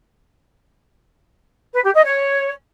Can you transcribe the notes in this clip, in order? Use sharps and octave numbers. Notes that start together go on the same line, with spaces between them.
B4
G4
D#5
C#5